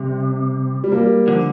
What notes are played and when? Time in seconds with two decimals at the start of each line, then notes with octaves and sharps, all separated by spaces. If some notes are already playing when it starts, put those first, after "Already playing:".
Already playing: C3 G3
0.84 G3
0.92 A#3
0.98 G3
1.27 D3 F3